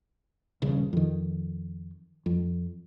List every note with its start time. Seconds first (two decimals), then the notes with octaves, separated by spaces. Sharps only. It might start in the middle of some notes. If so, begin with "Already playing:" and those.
0.62 D#1 C#3
0.93 F2 D#3
2.26 F2